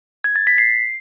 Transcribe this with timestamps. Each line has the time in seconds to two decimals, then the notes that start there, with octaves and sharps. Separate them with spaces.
0.24 G#6
0.36 A6
0.47 B6
0.58 C7